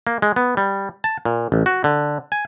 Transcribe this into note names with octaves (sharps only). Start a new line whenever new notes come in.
A#3
G#3
B3
G3
A5
A#2
A1
F#4
D3
G#5